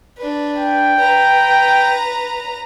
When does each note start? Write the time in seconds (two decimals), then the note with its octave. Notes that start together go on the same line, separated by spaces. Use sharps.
0.17 D4 B4
0.57 G5
0.98 B4 A#5